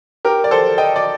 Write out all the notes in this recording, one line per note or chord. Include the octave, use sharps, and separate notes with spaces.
G4 A#4
D5
A4 C5
D#5 G5
D5